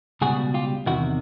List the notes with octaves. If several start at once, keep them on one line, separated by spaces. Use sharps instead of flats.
C#2 B2 G3 F#4 G#4
F4 G4
E2 C3 D#3 E4 F#4